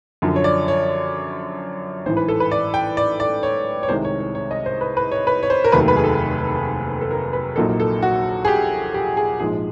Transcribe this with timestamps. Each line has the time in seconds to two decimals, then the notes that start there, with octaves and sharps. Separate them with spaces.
0.22 F#2 D3 F3
0.36 C#5
0.44 D5
0.68 C#5
2.06 A1 G#2 E3 C5
2.17 B4
2.28 A4
2.40 B4
2.51 D5
2.74 G5
2.97 D5
3.20 D5
3.43 C#5
3.83 C#5
3.89 C2 C3 D#3 G#3 C5
4.05 C#5
4.20 C#5
4.35 C#5
4.51 D#5
4.66 C5
4.81 B4
4.97 B4
5.12 C#5
5.27 B4
5.43 C#5
5.50 C5
5.64 A#4
5.72 F1 D#2 D#3 F#3 A3 B4
5.88 B4
5.96 G#4
6.04 A4
7.01 A4
7.11 A#4
7.33 B4
7.56 A#1 A#2 F#3 A#3 D#4 A4
7.80 A4
8.03 F#4
8.45 G#4
8.48 G4
8.94 G4
9.17 G#4
9.40 A#1 G#2 F3 G#3 G#4